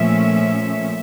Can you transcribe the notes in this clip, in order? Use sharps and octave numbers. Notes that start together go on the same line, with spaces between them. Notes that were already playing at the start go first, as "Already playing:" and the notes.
Already playing: A#2 F3 A3 C#4 E5